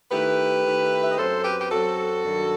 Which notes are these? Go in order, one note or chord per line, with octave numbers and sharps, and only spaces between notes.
D#3 A3 E4 G4 B4
D#3 A3 E4
E5
D#5
F#2 F#3 C4 A4 C5
G4 B4
G4
F#2 F#3 C4 F#4 A4
G2 D#3 F#3